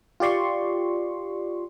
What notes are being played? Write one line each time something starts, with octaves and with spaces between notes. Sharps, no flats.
F4 G4 D5 C6 C#6